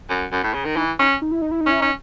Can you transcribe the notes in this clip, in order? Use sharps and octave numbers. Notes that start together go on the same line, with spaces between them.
F#2
F#2
A2
C#3
D#3
E3 D#4
C#4 D#4
D#4
E4
D#4
E4
D#4
C#4 E4
C#4 D#4